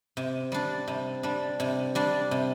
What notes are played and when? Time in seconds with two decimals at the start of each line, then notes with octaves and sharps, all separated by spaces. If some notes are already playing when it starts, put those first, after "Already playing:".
0.17 C3
0.52 G3 D4
0.88 C3
1.23 G3 D4
1.60 C3
1.95 G3 D4
2.31 C3